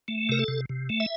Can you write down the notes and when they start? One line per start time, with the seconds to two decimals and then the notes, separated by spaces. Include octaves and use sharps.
0.08 A3
0.29 C3 A#4
0.39 A4
0.48 C3
0.69 C3
0.89 A3
1.00 E5